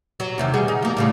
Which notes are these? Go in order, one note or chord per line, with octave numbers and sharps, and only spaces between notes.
F#3
E2 C3 D#3
G3 F#4 G#4
D#4
F3 A#3
A2 C#3 G3